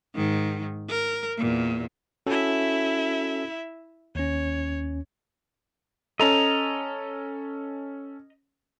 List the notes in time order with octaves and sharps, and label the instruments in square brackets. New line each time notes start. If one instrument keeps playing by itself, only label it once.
[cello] G#2 D#3
A#4
E2 A#2
[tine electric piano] C#4 F#4 A4 [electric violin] E4 E5
[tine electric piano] D#2 C#4 [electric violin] C#5
[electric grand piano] C#4 A4 [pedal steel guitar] D#5 A#5